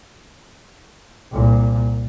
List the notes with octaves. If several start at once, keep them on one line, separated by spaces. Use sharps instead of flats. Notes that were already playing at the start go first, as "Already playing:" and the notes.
C2 A#2